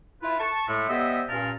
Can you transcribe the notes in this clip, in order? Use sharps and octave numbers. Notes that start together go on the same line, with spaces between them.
E4 F4 B4
A5 C#6
A2 G#3 A3
G3 B3 C5 D#5 E5
G2 A#2 C#4 A#4 F5 A5